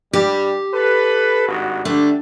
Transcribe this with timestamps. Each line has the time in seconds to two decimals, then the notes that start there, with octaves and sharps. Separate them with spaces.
0.13 G2 G3 G4
0.73 A4 B4
1.49 G#1 G2 F#4
1.85 D3 G3 A3 D4